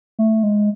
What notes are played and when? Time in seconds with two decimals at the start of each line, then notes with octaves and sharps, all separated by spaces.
0.19 A3
0.43 G#3